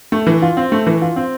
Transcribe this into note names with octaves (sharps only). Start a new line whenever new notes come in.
A3
E3
F4
C4
A3
E3
F4
C4